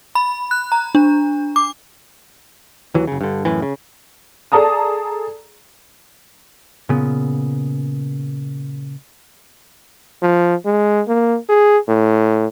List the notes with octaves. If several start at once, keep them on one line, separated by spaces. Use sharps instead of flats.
B5
F#6
A#5
D4
D6
D#2 E3 F#3
F#1 C#3
G2 D3
F#2 A2 E3
C#3
G#4 A4 D5 A5 A#5 D#6
A#2 C#3 B3
F3
G#3
A#3
G#4
A2